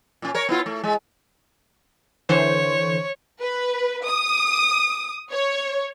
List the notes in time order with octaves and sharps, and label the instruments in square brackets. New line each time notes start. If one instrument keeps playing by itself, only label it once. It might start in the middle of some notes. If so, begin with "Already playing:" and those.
[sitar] A#2 C#4
A#4 C#5
B3 E4 F4
A3
G#3
[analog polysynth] D3 E3 C5 [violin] C#5
[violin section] B4
D#6
C#5